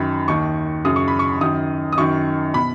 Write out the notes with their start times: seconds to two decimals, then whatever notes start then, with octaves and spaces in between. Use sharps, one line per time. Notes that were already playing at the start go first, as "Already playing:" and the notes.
Already playing: F#2 D#3 B5
0.28 D#2 D#3 C#6
0.85 F#2 C#3 D#6
0.96 C#6
1.08 B5
1.19 C#6
1.41 F#2 D#3 D#6
1.93 D#6
1.97 F#2 D#3 C#6
2.54 B2 B5